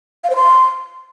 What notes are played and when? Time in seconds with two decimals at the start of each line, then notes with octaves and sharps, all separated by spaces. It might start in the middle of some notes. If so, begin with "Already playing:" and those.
0.24 F5
0.30 C5
0.36 C6